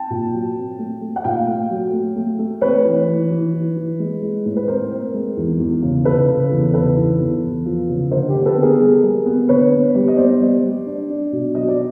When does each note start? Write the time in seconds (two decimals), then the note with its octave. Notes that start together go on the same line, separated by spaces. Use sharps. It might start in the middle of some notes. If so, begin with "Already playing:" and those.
Already playing: G5 A5
0.10 A#2
0.33 F#3
0.56 C4
0.79 A3
1.01 A3
1.16 F#5
1.24 A#2 F5 G5
1.48 A3
1.70 F#3
1.93 A3
2.16 A3
2.39 A3
2.61 C4 B4 C#5
2.85 E3
3.08 E3
3.31 E3
3.53 E3
3.76 E3
3.99 G#3
4.22 G#3
4.45 A2
4.56 B4
4.68 C4 A#4 C5
4.91 C4
5.14 G#3
5.37 E2
5.60 E2
5.82 C#3
6.05 C#3 A4 B4
6.28 C#3
6.51 E2
6.74 C#3 A4 B4
6.97 E2
7.20 E2
7.43 E2
7.66 F3
7.89 C#3
8.11 D3 A#4 C5
8.29 G4
8.35 D3
8.46 A4 B4
8.57 B3
8.63 G#4 A#4
8.80 G3
9.03 G3
9.26 B3
9.49 D3 B4 C#5
9.71 B3
9.95 G3
10.08 D#5
10.17 B3 C5 D5
10.41 G3
10.63 G3
10.86 D4
11.10 D4
11.32 B2
11.55 F#3 D#5
11.68 D5